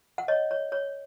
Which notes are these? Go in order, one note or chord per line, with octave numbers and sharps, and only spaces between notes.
F#5
C#5 D#5
C#5
C#5